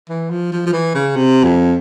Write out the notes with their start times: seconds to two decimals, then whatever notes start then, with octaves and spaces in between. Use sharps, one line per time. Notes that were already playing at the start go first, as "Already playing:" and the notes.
0.09 E3
0.30 F3
0.52 F3
0.66 F3
0.73 E3
0.94 C#3
1.16 C3
1.44 F2